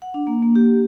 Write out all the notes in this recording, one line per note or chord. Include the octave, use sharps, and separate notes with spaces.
F#5
D4
A#3
A#3
G4